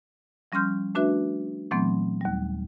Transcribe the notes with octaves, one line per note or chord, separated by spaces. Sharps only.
F3 G3 C#4 C6 F6 G6
A3 D4 F#4 B4 E5
A#2 E3 F#3 A3 B3 C4
D#2 G3